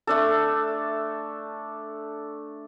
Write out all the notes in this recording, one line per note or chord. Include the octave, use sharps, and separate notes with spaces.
A3 D4 A4